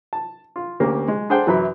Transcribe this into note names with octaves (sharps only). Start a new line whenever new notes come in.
A5
F4
D2 A#3 C#4 G4
G#3
D4 G#4 A4 C5 F#5 G5
F#2 E3 F#3 E4 B5